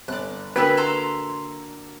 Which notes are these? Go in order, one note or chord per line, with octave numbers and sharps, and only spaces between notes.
G1 D5 F#6
D3 A#3 E4 F#4 G#4 B4 G5
A4 A#5 C6